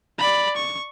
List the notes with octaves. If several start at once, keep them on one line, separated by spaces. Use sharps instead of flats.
D5 B5
C#6